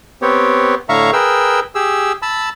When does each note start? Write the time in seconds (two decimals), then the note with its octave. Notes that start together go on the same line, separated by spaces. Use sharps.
0.22 B3 C4 G4 C#5
0.89 A2 D3 E5 F5 A#5 C#6
1.13 G#4 A#4 B4 G5 E6
1.75 G4 G#4 E6
2.22 A5 B5 E6